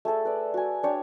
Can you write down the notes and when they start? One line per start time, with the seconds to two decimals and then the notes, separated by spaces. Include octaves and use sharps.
0.05 A3 G#4 A4 E5
0.25 B4 D5
0.54 F#4 G#5
0.83 D4 C#5 G5